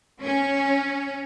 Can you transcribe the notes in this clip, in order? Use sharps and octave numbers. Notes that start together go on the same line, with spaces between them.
C#4